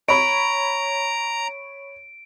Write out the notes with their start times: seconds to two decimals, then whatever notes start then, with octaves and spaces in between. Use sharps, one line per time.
0.08 C#5 A#5 B5 C#6 D7